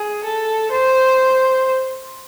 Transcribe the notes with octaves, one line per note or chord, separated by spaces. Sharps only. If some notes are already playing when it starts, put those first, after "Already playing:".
Already playing: G#4
A4
C5